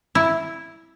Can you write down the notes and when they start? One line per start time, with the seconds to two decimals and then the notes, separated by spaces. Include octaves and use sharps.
0.15 E4